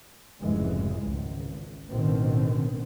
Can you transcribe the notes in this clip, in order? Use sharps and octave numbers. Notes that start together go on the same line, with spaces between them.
F1 G#2 C#3 E3 G#3
G#1 C#2
A1 B2 D3 D#3 C4